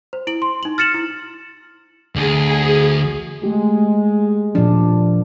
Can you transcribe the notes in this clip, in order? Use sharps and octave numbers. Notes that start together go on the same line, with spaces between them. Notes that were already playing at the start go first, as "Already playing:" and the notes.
C5
E4 D7 F#7
C6
D#4 F#7
F6 A6 C#7 E7 F#7
E4
D2 G#4
G#3 A3 G4
A#2 F3 D4